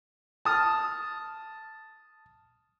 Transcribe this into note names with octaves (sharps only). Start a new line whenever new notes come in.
A5 D#6 F6